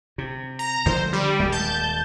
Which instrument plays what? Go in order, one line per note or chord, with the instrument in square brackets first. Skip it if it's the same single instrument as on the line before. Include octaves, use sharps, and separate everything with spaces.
[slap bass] C3
[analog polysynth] A#5
[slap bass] D3 F3 G#3 [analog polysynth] C5
[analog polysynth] G3
[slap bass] D#1 G#3
[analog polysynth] A5 G6